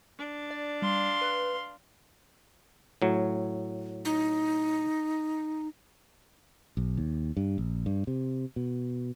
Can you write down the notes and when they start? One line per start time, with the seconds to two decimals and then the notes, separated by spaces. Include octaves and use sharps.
0.18 D4
0.51 D5
0.82 G3 F5 C6
1.21 B4
3.02 A2 F#3
4.05 D#4
6.77 B1
6.97 D#2
7.37 G2
7.58 A#1
7.86 G2
8.07 C3
8.56 B2